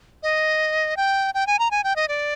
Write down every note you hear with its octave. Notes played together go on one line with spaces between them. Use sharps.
D#5
G5
G5
G#5
A#5
G#5
G5
D#5
D5